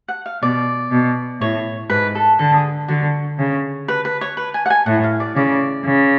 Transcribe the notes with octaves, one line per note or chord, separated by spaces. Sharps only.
F#5
F5
B2 D5
B2
A2 C#5
G#2 B4
A4
D3 A4
G#4
D3 F#4
C#3
B4
B4
C#5
B4
G#5
F#5
G#5
A2 F#5
F5
D5
C#3 D5
C#3